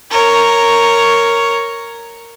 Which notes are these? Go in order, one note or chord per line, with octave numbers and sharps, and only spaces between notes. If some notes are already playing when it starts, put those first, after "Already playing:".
A#4 C#5